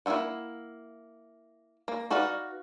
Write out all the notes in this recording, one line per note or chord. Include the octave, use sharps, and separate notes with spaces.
A#3 E4 F4 E5 F#5
A#3
D#4 F#4 B4 D5 F5